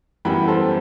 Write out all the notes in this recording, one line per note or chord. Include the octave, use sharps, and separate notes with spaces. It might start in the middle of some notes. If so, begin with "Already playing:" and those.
F#2 E3 G3 B3 G5 B5
A4 C5